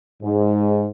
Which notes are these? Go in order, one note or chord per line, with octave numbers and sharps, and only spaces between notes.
G#2